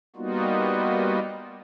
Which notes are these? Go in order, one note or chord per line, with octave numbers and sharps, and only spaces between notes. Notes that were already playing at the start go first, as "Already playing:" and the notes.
G3 A#3 B3 D#4 F4 F#4